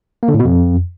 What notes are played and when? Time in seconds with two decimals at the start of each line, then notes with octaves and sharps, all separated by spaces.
0.23 A#3
0.28 D3
0.34 A2
0.39 B2
0.45 F2